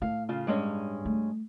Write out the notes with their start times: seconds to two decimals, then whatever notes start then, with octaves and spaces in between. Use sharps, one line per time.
0.02 A2 F5
0.29 C#3 F4
0.47 G2 G#3 C#4
1.05 G3 A3